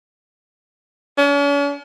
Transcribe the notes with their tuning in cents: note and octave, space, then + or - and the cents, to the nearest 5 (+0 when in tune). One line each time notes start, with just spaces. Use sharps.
C#4 +45